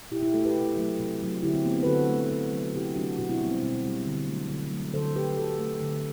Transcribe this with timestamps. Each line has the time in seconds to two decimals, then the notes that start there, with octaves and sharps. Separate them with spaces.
0.11 B2 E4 G4
0.23 E4 G4
0.33 A3 F#4 A4
0.45 G4 B4
0.55 C3
0.77 F#3 A3
0.99 C3
1.21 F#3 A3
1.43 D3 E4 G4
1.54 C4
1.65 A3 B3
1.76 C4
1.83 B4
1.87 D3 F#4 A4
2.09 A3
2.31 C3
2.53 F#3 A3
2.63 F#4
2.74 C3 E4 G4
2.96 F#3 A3 D4 F#4
3.18 B2 D4 F#4
3.29 C4 E4
3.40 G3 B3
3.51 C4
3.62 B2
3.85 G3
4.06 D3
4.28 F#3 A3
4.50 D3
4.71 F#3 A3
4.94 D3 A4 C5
5.15 A3 G4 B4
5.31 G4
5.38 D3 F#4 A4
5.60 A3
5.82 D3